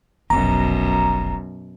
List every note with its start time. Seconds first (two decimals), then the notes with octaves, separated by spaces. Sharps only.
0.30 F1 B1 F#2 B2 A#5